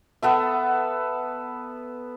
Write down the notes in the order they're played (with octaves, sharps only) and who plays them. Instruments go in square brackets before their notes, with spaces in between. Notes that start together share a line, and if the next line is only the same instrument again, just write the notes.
[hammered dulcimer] B3 A4 E5